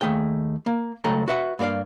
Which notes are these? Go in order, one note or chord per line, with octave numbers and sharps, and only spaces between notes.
D#2 A3 G#4 G5
A#3
C#2 F#3 A3 A4 G5 A#5
F#4 B4 E5 F#5
G2 A#3 F#4 D5 F5